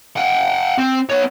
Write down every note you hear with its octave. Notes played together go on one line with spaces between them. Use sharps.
F#5 G5
C4
B3 C#5